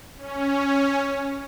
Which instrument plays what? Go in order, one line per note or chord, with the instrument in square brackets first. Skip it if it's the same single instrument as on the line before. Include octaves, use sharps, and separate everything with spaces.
[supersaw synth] C#4